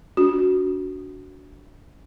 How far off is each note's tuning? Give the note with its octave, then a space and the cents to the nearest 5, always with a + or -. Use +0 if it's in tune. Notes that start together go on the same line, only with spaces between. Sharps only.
D4 -25 F#4 +0